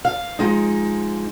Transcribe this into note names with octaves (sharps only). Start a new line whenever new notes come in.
F5
F3 G#3 D#4